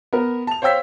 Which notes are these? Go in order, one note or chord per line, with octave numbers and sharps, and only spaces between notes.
B3 A#4
A5 F7
C5 C#5 F5 G5 E6 B6